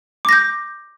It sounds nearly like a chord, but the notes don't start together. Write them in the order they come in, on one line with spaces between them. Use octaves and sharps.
D6 A#6 G6